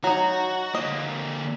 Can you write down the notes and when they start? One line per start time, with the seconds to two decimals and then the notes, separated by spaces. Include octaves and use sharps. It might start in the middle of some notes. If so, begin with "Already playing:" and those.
0.04 F#3 D#4 F#4
0.75 D3 A#3 D#5